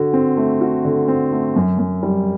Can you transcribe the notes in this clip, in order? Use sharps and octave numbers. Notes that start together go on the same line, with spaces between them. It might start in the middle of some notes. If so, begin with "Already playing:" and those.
Already playing: D3 F#4
C4
A3
F#4
D3
C4
A3
F#2
F#2
G3